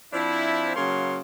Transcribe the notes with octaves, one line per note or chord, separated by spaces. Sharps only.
F3 C4 D4 E4
C#3 F#3 A#3 C#5 C6